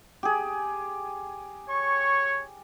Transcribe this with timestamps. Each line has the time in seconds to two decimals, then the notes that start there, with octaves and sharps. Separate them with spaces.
0.23 G4 G#4
1.70 C#5 C#6